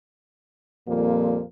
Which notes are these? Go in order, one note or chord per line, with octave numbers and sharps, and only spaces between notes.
F2 A#2 F3 G3 A#3